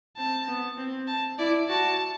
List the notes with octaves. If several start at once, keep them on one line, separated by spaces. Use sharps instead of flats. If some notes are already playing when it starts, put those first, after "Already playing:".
C4 A5
B3
C4
A5
E4 D5
F#4 A5